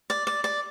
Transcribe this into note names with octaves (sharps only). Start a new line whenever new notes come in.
D5
D5
D5